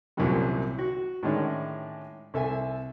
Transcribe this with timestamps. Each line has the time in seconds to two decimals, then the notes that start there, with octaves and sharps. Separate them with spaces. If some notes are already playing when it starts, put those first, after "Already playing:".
0.17 C2 F#2 A#2 E3 F#3 G3
0.79 F#4
1.23 A2 D#3 G#3 C#4 D4 E4
2.34 C2 A4 E5 G#5